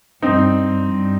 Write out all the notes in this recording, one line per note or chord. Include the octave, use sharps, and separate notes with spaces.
G2 C4 D#4
G2